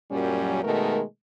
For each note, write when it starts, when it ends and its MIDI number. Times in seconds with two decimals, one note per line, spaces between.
0.11 0.62 42
0.11 0.62 46
0.11 0.62 54
0.11 0.62 55
0.11 0.62 61
0.64 1.02 47
0.64 1.02 51
0.64 1.02 56
0.64 1.02 57
0.64 1.02 70